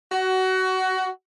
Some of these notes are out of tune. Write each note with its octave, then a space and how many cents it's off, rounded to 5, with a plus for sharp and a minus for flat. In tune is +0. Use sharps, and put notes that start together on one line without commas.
F#4 +20